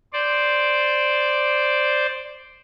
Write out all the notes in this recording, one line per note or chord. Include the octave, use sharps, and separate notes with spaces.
C5 D5